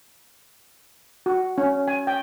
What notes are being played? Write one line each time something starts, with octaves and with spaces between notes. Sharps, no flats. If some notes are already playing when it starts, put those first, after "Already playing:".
F#4
C#4
G#5
G5